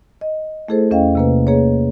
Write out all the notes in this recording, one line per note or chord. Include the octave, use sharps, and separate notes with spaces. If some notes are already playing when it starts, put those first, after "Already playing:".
D#5
A3 E4 G#4 A4 C5
E2 C#4 D#5 F5 G5
C3 A#3 B4
A#3 G#4 B4 C#5